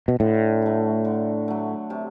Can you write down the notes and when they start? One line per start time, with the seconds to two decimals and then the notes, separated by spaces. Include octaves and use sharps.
0.08 B2
0.20 A2 D3
0.62 F#3 A3
1.05 D3
1.48 F#3 A3
1.90 C3